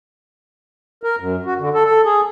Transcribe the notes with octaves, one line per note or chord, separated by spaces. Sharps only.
A#4
F#2
F#4
D3
A4
A4
G#4